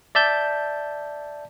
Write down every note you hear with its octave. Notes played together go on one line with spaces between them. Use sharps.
D5 E5 A5 G6